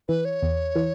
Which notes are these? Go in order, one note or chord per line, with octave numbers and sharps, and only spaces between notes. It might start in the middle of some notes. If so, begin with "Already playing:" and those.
E3 B4
C#5
E2
E3